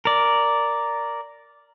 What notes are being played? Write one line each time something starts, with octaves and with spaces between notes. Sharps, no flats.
A#4 D5